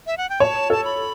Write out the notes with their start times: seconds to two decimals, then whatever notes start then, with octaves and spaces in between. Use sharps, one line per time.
0.07 E5
0.18 F#5
0.30 G5
0.40 C#5 A5
0.70 A4 A5
0.85 B5